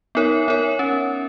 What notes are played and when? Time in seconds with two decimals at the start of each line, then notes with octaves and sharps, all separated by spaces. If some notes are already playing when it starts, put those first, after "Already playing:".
0.15 B3 D#4 A#4 C#5
0.48 B3 D#4 A#4 C#5
0.79 C#4